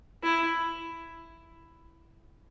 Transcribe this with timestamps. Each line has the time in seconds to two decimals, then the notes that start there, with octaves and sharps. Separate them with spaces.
0.23 E4